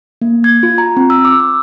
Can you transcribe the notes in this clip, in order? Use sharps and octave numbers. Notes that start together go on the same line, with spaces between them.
A#3
G#6
F4
A#5
C4
E6
D6
E6